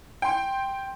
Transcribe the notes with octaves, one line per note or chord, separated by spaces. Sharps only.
G5 C6